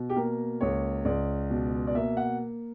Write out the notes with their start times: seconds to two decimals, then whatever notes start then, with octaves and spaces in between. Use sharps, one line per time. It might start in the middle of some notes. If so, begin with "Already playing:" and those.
Already playing: B2
0.10 G4
0.16 A#3 A#4
0.61 C#2 C#5
1.05 C#2 D5
1.50 B2
1.87 D5
1.95 A#3 E5
2.17 F#5